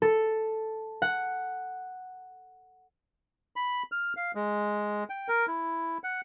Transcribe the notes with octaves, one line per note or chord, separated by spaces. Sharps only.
A4
F#5
B5
F6
F5
G#3
G5
A#4
E4
F#5